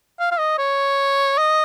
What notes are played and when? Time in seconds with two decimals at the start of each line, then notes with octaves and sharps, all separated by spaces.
0.19 F5
0.31 F5
0.39 D#5
0.58 C#5
1.38 D#5